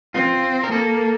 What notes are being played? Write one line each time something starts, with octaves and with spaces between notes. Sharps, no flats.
C4 F4
A#4
A#3 A4